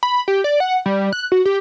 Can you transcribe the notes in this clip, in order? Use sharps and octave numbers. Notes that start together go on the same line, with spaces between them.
B5
G4
D5
F#5
G3
F#6
F#4
G4